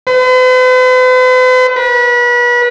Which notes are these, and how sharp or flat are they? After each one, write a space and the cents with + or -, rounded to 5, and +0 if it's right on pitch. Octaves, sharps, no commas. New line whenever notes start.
B4 +45
B4 -35